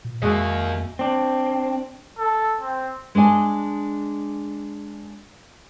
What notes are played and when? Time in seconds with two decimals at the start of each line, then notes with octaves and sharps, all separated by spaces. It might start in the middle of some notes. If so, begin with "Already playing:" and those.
0.05 A#2
0.22 F2 G#3 A#3 F#4 D#5 E5
0.99 C4 D4
2.19 A4
2.61 C4
3.15 G#3 D4 D#5 G#5 A5